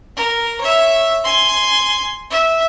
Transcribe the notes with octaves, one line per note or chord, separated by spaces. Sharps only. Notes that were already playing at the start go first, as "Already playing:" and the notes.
A#4
C#5 E5
G#5 C6
E5